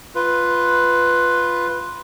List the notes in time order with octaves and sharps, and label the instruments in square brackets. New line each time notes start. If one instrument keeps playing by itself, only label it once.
[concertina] F4 B4